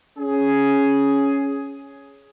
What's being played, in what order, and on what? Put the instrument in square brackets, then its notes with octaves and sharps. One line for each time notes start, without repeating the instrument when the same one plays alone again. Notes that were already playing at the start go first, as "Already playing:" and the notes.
[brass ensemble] C#4 G#4